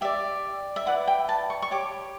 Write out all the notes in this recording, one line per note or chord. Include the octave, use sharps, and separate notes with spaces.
G4 D5 E5
E5
E4 B4 D5 F#5
G5
A5
C#6
C#6
G4 C#5 D6